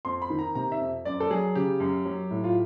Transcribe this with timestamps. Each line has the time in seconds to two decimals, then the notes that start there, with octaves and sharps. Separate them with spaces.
0.05 F2 C6
0.22 B5
0.30 D#3
0.39 A#5
0.55 C3 A#5
0.72 E5
0.80 F2
1.05 F#2 D5
1.20 A4
1.30 F#3 G#4
1.55 C#3 G4
1.80 F#2
2.05 F#3
2.31 A2
2.44 F4